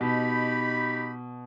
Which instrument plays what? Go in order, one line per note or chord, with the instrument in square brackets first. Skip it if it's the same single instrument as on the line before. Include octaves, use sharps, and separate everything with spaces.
[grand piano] B2 [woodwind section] D#4 G4 B5